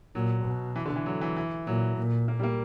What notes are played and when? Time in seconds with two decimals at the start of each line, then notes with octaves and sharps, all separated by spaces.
0.15 A#2 F#3
0.45 B2
0.76 E3
0.85 D3
0.96 E3
1.06 F#3
1.21 E3
1.36 E3
1.67 A#2 F#3
1.97 A#2
2.28 A#3
2.39 G3
2.43 A#3